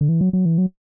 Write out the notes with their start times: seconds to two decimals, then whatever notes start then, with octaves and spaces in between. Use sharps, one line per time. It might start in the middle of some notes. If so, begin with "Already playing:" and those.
0.01 D3
0.09 E3
0.21 F#3
0.33 F#3
0.45 E3
0.58 F#3